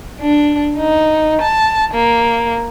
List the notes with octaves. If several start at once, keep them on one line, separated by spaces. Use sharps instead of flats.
D4
D#4
A5
A#3